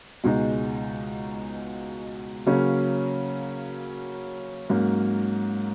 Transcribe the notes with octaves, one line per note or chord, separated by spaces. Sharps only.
C#2 B2 G#3 D#4
C#3 F#3 A#3 C#4
G#2 F#3 A#3 C#4